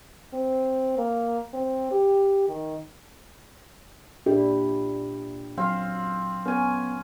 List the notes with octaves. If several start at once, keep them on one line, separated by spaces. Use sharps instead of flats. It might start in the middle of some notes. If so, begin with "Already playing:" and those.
C4
A#3
C4
G4
D#3
A#2 D4 E4 G4
F#3 C4 F5
B3 C#4 G#5